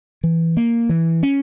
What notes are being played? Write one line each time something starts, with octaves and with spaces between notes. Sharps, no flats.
E3
A#3
E3
C#4